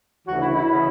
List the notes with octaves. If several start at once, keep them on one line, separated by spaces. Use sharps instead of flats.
D2 C#3 E3 F#4
E4
E4
C#3 E3